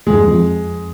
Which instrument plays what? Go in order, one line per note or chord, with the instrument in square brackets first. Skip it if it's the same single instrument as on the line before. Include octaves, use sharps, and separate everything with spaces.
[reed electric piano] E2 G2 [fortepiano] G#3
[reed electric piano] F2